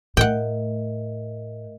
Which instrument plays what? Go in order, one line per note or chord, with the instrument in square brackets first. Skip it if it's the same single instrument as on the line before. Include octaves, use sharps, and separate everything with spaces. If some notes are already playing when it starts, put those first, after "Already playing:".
[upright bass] A2 [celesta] A#4 D#5 E5 [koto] F#5 G5